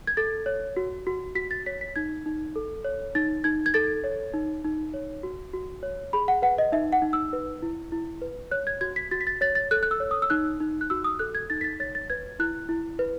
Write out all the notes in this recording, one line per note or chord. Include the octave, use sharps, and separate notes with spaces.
G#6
A4 A6
C#5
F#4
F#4
F#4 B6
A6
C#5 B6
B6
D#4 G#6
D#4
A4
C#5
D#4 A6
D#4 G#6
G#6
A4 A6
C#5
D#4
D#4
C#5
F#4
F#4
C#5
G#4 B5
F#5
B4 F#5
D#5
D#4 E5
F#5
D#4
E6
B4
E4
E4
B4
C#5 F#6
G#6
F#4 G#6
B6
F#4 A6
B6
A6
C#5 A6
A6
A4 F#6
F#6
E6
C#5
D#6
E6
D#4 F#6
D#4
F#6
F#4 E6
D#6
A4 F#6
G#6
D#4 A6
B6
A6
C#5 A6
A6
B4 G#6
E4 F#6
E4
B4